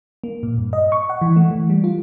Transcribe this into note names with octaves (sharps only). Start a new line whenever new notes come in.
A#3
A#2
G2
D#5
C#6
F#5
E3
A3
E3
G3
F4